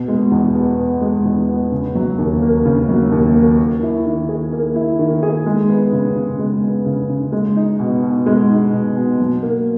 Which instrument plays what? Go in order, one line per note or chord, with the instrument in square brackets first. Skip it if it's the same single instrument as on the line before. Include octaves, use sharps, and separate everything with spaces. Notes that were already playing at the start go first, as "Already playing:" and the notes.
Already playing: [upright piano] B2
G#3
E2
B3
B2
G#3
E2
B3
C#3
F#3
D#2
A#3
C#3
F#3
D#2
A#3
A#3
E4
D#3
G#4
A#3
E4
D#3
G#4
G#3
B3
C#3
C#3
G#3
B3
C#3
C#3
G#3
D#4
B2
B2
G#3
D#4
B2
B2
F#3
A#3